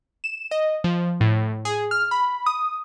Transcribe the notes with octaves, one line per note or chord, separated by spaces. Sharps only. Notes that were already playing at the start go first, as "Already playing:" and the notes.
E7
D#5
F3
A2
G#4
F6
B5
D#6